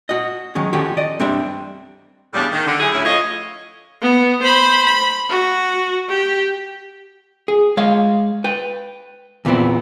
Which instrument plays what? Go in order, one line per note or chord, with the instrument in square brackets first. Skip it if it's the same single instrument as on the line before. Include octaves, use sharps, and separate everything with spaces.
[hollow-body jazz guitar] F#4 D#5
D#3 F#3 G#3 C#4
D#3 F3 C#4 F#4 G4 A4
D5 D#5
G3 C4 D4 G4 E5
[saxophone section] E2 A2 C#3 G3 A3 D4
D#3
D3
D3 F#3 E4 G#4
D2 A2 C#4 E4
F3 A3 F4 C#5 D#5
[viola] B3
C5 B5
B5
F#4
G4
[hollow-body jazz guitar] G#4
G#3 C#5 F5
B4 G5
E2 A#2 E3 B3 C4